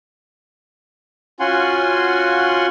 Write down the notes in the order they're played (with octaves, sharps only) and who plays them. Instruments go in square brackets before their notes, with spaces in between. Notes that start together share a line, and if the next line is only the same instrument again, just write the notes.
[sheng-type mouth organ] C#4 F4 F#4 F#5 G#5 C6